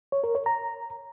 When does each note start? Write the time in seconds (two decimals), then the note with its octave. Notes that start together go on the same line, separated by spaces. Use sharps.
0.12 C#5
0.24 A#4
0.35 C#5
0.46 A#5